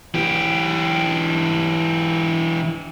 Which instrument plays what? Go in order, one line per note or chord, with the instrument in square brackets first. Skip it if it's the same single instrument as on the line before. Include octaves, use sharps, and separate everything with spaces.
[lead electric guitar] E3 G4